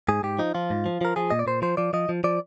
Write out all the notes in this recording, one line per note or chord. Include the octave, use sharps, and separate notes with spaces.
G#2 G#4
G#2 G4
F3 D#4
F3 F4
G#2
F3
F3 A#4
F3 G#4
A#2 D#5
D5
A#2 C5
F3 C5
F3 D5
F3 D#5
F3
F3 D5